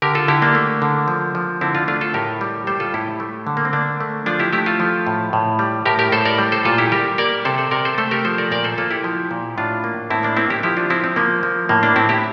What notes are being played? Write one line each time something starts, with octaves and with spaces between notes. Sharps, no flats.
D3 G4 A#4
F4 A4
D3 E4 G4
A#3 D4
A3
D3
F3
F3
D3 C4 E4
D4 F4
A3 D4 F4
F4 A4
A2 G4 A#4
G3
G3 A4 C5
F4 A4
A2 E4 G4
A3
D3
A#3
C4
D3 A#3 D4
A3
F3 D4 F4
E4 G4
A3 E4 G4
F4 A4
F3
A2
A2
G3
A2 G4 A#4
G4 A#4
A2 A4 C5
A#4 D5
G3
A4 C5
A#2 F4 A4
E4 G4
G3 G4 A#4
A#3 A#4 D5
C3 A4 C5
A4 C5
C3 A#4 D5
A4 C5
A3 A4 C5
G4 A#4
F3 A4 C5
A#4 D5
A#2 A#4 D5
A4 C5
A#3 F4 A4
E4 G4
F3
A#2
A2 D4 F4
A#3
A2 C4 E4
A#3 D4
A#3 C4 E4
E4 G4
F3 E4 G4
D4 F4
F3 C4 E4
C4
F3 A#3
F3
A2 A#3
A#3 D4
A2 C4 E4
E4 G4